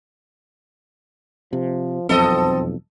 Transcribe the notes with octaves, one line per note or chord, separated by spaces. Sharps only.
C3 F3
E1 B1 F2 C4 A4 D#5